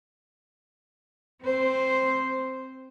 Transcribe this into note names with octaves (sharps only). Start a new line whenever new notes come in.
C4 C5